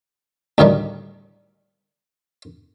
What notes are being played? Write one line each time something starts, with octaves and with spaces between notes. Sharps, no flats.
D2 A2 D#3 G3